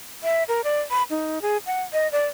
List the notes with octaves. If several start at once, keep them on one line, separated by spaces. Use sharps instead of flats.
E5
A#4
D5
B5
D#4
G#4
F#5
D#5
D5